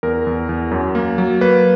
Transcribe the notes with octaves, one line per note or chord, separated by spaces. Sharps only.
E2 A#4
E2
E2
F#2
A#3
F#3
A#3 B4